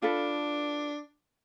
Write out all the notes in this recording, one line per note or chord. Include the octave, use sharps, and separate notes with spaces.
D4 F4 A4 B4